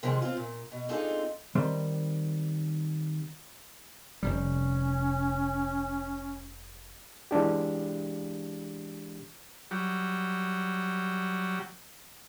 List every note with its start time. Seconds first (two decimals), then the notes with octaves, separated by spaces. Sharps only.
0.03 C3 D#3 F3 G3 G#3
0.22 C4 F4
0.37 A#2
0.72 B2
0.89 C4 D4 D#4 F4 G#4 A4
1.55 D#3 G3 C4 C6
4.23 F1 C3 G3 C#4
7.31 E3 G#3 D4 G4
9.71 F#3 G3